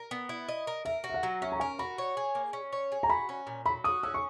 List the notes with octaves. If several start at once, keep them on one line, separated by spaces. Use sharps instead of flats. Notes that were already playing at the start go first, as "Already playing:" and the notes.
Already playing: A#4
B3
E4
D#5
A#4
A#4 E5
F#4
E5
F#5
F#3
C#4 E5
A#5
A#4 G#5
F#4 B5
C#5
G#4
A#3
C#4
C#5
G#4
A#5
F#4 B5
C#4
A#2
F#3 B5
F#4 D#6
C#4 E6
C#6